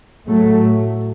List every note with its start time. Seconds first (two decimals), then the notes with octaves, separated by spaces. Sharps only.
0.28 A2 F#3 A3